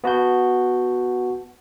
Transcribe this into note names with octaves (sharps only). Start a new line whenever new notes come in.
B3 F#4 A5 G6